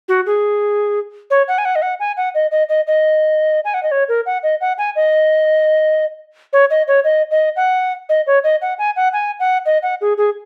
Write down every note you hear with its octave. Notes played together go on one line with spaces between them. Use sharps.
F#4
G#4
C#5
F#5
G#5
F#5
D#5
F#5
G#5
F#5
D#5
D#5
D#5
D#5
G#5
F#5
D#5
C#5
A#4
F#5
D#5
F#5
G#5
D#5
C#5
D#5
C#5
D#5
D#5
F#5
D#5
C#5
D#5
F#5
G#5
F#5
G#5
F#5
D#5
F#5
G#4
G#4